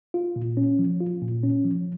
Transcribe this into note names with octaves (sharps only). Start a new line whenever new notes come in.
F4
A#2
C#4
F3
F4
A#2
C#4
F3